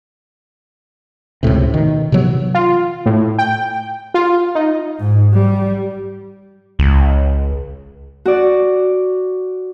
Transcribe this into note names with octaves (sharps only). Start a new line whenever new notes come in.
C#2 F#2 A2 C3
B2 D#3
C3 E3 F#3 B3
F4
A2
G5
F4
D#4
G#2
G3
C#2
F#4 D5